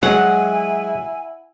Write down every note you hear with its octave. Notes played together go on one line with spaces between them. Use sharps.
F#3 G#3 E4 F#5 G#5